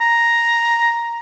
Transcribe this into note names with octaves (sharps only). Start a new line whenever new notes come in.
A#5